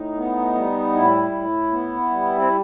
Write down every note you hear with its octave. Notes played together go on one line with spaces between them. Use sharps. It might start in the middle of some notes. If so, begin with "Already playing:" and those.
Already playing: A2 D#4
B3
G3
A2 E4
A2
B3
G3
C4